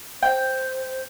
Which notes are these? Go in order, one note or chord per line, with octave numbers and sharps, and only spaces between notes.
C5 G5